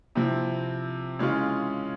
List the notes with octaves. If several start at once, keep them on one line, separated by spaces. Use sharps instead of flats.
C3 F3 C4 E4
C#3 E3 G#3 C#4 F4